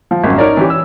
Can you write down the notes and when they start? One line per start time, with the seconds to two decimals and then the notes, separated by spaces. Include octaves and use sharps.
0.11 F3
0.24 G#1 F#2
0.38 D#4 A#4 C#5 D5 A#5
0.57 E3 C#4 G4
0.70 E6